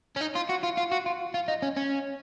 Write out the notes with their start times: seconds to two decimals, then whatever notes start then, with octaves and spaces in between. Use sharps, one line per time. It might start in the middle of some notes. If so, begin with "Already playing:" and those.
0.16 C#4
0.21 D#4
0.35 F4
0.49 F#4
0.63 F4
0.77 F4
0.91 F#4
1.06 F4
1.34 F4
1.48 D#4
1.62 C#4
1.77 C#4